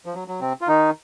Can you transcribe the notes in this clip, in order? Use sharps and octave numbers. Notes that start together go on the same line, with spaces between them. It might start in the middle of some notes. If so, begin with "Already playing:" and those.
F3
F#3
F#3
C3 C4
F4
D#3 D#4